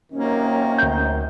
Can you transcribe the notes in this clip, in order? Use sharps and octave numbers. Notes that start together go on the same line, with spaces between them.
F#2 C3 D#3 A#3 C#4
D2 G6